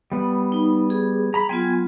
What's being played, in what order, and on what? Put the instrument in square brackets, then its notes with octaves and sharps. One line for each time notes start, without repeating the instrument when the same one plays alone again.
[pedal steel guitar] G3 B3
[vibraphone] D#4
G#4
[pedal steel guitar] A#5 B5
[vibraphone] F#3 B3 F4 [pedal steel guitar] G5 G#5 C6